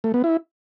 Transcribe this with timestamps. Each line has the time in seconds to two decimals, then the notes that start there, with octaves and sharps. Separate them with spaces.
0.04 A3
0.14 B3
0.24 E4